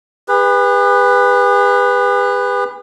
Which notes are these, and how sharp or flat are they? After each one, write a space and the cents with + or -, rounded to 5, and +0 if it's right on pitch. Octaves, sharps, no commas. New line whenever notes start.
G#4 -45 B4 +0